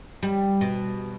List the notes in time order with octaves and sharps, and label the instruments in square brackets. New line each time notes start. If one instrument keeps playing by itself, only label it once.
[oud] G3
B2